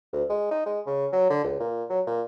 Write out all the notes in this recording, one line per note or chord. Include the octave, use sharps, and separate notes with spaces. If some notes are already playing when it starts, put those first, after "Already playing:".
D2
G#3
D#4
G#3
C#3
F#3
D3
C#2
A#2
F#3
A#2